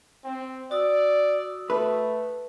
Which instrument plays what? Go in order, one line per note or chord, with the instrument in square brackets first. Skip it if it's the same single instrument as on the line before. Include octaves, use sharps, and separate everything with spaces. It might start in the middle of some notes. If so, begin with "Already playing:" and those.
[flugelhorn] C4
[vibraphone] F#4 D#6 E6 [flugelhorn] D5
[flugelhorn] A3 [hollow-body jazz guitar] B4